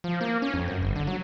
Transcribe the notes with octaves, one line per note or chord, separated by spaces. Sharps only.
F3
A#3
C#4
F2
F#2
G1
D3
F#3